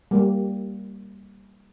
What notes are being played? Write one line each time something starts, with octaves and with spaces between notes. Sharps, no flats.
G3 A#3